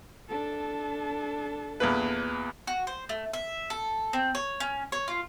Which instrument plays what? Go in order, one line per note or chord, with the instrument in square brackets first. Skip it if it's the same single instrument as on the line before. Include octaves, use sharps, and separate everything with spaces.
[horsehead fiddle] D4 A4
[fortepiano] E2 A#2 B4
[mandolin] F#4
C5
A3
E5
A4
C4
C#5
C#4
C#5
F4